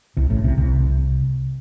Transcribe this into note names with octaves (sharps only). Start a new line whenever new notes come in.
C2 C3
A1 A2
C2 C3
C2 C3